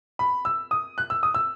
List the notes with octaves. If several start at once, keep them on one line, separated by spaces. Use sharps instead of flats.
B5
E6
D#6
F#6
E6
D#6
E6